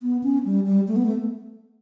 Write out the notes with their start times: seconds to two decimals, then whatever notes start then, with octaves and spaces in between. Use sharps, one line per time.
0.02 B3
0.23 C#4
0.45 G3
0.66 G3
0.88 A3
0.96 B3
1.06 A3